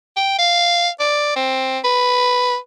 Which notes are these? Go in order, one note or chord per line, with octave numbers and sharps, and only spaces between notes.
G5
F5
D5
C4
B4